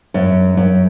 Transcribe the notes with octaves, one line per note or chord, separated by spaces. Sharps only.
F#2
F#2